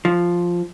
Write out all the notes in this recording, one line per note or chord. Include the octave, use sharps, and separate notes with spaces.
F3